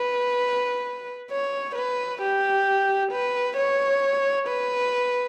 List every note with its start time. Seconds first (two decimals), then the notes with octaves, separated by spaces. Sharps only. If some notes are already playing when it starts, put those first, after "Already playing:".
Already playing: B4
1.31 C#5
1.75 B4
2.21 G4
3.11 B4
3.57 C#5
4.48 B4